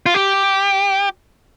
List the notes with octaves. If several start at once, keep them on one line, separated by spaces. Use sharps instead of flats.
F4
G4